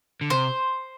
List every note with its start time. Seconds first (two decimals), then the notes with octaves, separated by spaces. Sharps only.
0.21 D3
0.30 C3 C5